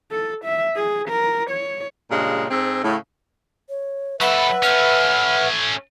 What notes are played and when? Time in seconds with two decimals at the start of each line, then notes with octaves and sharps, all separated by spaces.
0.11 A4
0.44 E5
0.76 G#4
1.09 A#4
1.50 C#5
2.10 G2 A#2 C#3 G#3
2.51 G#2 C4 G#4 A4
2.84 A2 C#3
3.69 C#5
4.21 F#3 A4 B4 E5 F#5 B5
4.63 A3 C#4 F6